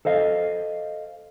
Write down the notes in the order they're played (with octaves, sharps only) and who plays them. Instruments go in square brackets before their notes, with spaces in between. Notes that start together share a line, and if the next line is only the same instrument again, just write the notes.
[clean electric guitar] A4 C5 D#5 F5